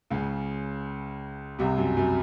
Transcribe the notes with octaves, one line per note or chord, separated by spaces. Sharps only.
C#2 C#3
C2 C3
F#2
F#2